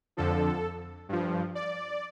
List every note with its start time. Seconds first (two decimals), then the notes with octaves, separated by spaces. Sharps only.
0.17 F2 D3 F3 A4
1.09 G2 F3
1.55 D5